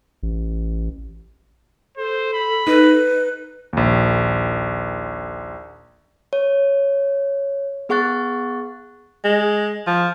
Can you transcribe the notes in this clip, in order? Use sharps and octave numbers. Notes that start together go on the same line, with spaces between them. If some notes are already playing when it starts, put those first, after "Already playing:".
A1
A4 C5
B5
D#4 B4
A#1 D#2
C#5
B3 G#4 F#5 C#6 F#6 A6
G#3
F3